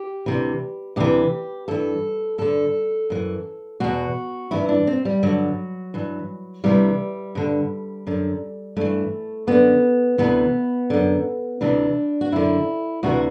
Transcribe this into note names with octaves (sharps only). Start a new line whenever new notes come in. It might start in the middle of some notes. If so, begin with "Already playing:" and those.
Already playing: G4
D2 C3 E3
D2 C3 E3 G4
G2 E3 A4
G2 D3 A4
F#2 E3
E2 B2 F#4
G2 E3 E4
D4
C4
G3
G2 D3 F#3
G2 E3
D2 C3 E3 G3
G2 D3
F#2 D3
G2 E3 A3
F#2 D3 B3
D2 C3 E3 B3
F#2 D3
D2 C3 E3 D4
F#4
F#2 D3 E4
D2 C3 E3 F#4